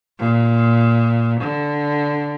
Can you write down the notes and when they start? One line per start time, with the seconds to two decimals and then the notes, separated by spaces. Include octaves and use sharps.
0.19 A#2
1.41 D3